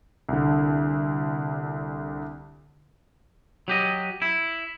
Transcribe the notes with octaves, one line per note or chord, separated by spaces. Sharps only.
C2 D3
F#3 G4 D#5
E4